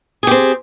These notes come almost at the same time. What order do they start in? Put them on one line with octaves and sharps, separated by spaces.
G#4 G4 C4